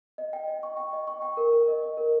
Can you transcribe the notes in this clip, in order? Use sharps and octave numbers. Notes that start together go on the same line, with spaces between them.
D#5
G5
D#5
C#6
G5
D#5
C#6
G5
A#4
A#4
D#5
D#5
A#4